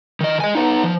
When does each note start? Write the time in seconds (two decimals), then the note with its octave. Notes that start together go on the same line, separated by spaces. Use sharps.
0.21 D#3 D#5
0.40 D#5 G#5
0.55 B3 D#4
0.84 F3